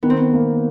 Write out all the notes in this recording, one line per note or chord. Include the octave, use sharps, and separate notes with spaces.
D#3 B3
C4
B3
A#3